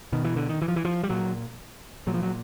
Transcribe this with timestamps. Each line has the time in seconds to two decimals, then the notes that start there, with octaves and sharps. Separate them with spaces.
0.13 B2 D#3
0.25 E3
0.36 D3
0.49 D#3
0.62 E3
0.68 F3
0.76 E3
0.85 F3
1.03 G3
1.10 A#2 F#3
2.07 A#2 F#3
2.14 F3
2.22 F#3